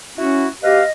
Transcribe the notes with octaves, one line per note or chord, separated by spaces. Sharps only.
C#4 E4 F#4
B2 G4 B4 D#5 F5